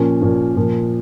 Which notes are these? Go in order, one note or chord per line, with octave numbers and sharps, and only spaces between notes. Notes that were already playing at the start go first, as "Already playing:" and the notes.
Already playing: A#2 F3 A#3 C#4
A#2 F3 A#3 C#4
A#2 F3 A#3